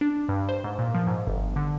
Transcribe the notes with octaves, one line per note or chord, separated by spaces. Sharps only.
D4
G2
C5
G#2
A#2
F3
G#2
G1
D3